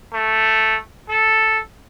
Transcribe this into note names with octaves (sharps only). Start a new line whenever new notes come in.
A3
A4